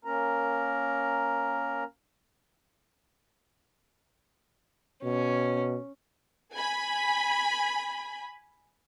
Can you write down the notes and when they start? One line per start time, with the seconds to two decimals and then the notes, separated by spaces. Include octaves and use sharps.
0.05 A#3 C#4 A#4 A#5
5.04 B2 C#4
6.54 G#5 B5